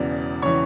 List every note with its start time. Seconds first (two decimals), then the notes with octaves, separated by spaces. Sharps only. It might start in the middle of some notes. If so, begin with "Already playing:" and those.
Already playing: E1 E2 C#3 E3 D5
0.42 C#3 E3 C#5 C#6